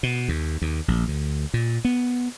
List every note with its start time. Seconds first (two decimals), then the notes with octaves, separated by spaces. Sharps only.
0.03 B2
0.28 D#2
0.62 D#2
0.88 A#1
1.08 D2
1.54 A#2
1.85 B3